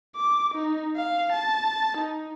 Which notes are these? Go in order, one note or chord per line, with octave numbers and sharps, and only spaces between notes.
D6
D#4
F5
A5
D#4